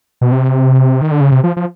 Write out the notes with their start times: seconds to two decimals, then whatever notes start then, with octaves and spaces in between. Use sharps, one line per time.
0.21 B2
0.32 C3
1.01 D#3
1.11 D3
1.21 C#3
1.32 C3
1.44 F3
1.57 F3